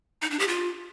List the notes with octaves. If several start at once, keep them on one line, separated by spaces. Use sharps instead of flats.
D#4
D4
G4
F4